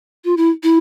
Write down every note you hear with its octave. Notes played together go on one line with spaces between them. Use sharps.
F4
E4
E4